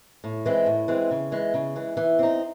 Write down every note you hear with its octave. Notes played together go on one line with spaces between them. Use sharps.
A2
E3 G#3 C4
A2
E3 G#3 C4
C#3
E3 G#3
C#3
E3 G#3
E3
C4 D#4